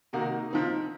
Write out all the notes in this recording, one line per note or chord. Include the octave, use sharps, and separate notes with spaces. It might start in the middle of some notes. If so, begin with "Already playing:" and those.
C3 D#3 A#3 D#4 F#4
F3 C4 D#4